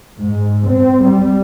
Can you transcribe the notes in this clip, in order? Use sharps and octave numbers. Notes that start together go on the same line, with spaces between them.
G#2
C4
G3